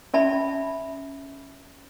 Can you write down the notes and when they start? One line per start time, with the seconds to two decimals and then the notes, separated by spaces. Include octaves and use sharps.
0.14 C#4 D5 E5 A5 B5